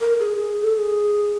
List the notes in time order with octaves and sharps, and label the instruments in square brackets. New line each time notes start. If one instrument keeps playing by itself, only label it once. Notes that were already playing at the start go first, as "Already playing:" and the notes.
[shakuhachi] A#4
G#4
G#4
A4
A4
G#4